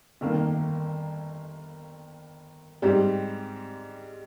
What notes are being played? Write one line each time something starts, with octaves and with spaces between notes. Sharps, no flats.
G1 F2 D#3 A#3
G#2 G3 C4 G4